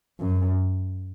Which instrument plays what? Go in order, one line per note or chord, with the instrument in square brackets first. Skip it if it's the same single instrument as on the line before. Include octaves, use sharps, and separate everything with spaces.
[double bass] F#2